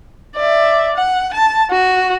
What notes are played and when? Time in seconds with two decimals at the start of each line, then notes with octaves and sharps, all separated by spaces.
0.36 D5 E5
0.96 F#5
1.34 A5
1.71 F#4